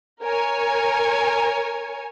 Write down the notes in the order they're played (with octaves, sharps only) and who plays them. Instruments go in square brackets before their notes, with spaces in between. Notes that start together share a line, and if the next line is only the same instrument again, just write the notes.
[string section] A#4 C#5 G#5